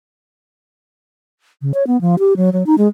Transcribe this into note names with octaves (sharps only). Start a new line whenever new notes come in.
C#3
C#5
B3
F3
G4
F#3
F#3
D#4
G#3